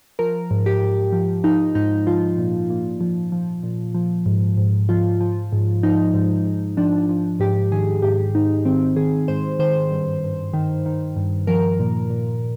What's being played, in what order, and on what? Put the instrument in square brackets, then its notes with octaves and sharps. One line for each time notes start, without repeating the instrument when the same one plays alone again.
[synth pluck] F3 A#4
G#2
G4
G#2
F3
F3 D#4
G#2 D#4
F3 F4
A#2
A#2
F3
F3
A#2
F3
G#2
G#2
F3 F4
F3
G#2
F3 D#4
G#2
G#2
F3 D4
F3
G#2 G4
D#3 G#4
G#2 G4
G#2 D#4
D#3 C4
D#3 G#4
G#2 C5
D#3 C5
G2
G2
D#3
D#3
G2
F3 A#4
A#2
A#2